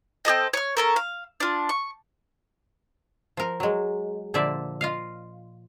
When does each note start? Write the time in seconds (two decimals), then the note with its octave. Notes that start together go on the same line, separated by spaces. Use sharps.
0.25 C4 G#4 A4 D#5
0.53 C#5 F6
0.77 C#4 A4 A#4
0.96 F5
1.40 D4 F4
1.69 C#6
3.37 F3 A#4
3.60 F#3 G#3
4.34 A#2 D3 F3 D5 E5
4.81 F4 D#5 F5